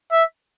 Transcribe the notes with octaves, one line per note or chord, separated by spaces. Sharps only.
E5